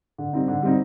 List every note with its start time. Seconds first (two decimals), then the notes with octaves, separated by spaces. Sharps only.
0.18 D3
0.33 G3 C4 D#4
0.48 D3
0.62 G3 C4 D#4